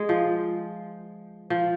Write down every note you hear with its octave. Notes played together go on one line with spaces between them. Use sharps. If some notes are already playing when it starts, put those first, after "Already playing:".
Already playing: G#3
F3
F3